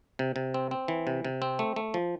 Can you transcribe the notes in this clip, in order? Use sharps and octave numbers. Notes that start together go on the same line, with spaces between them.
C3
C3
C4
C4
E3
C3
C3
C4
A3
A3
F3